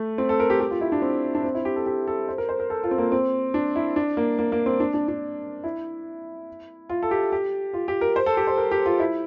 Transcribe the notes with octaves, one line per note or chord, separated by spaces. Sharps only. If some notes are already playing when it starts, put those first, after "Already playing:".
Already playing: A3
C4
A4
A#4
G4
G4
F4
E4
D4
C4
D4
C4
E4
G4
A4
G4
A4
C5
A#4
C5
A#4
A4
F4
C4
A#3
C4
D4
E4
D4
A#3
A#3
A#3
C4
D4
D4
D4
E4
F4
A4
G4
G4
F4
G4
A#4
C5
A4
G4
C5
A#4
G4
F4
E4